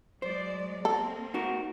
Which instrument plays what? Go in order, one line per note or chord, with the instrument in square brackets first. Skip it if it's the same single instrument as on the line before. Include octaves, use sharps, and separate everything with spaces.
[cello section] F#3 G#3 D5 [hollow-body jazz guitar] C5
[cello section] A#3 C4 [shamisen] A4
[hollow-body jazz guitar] D#4 F#4 A#4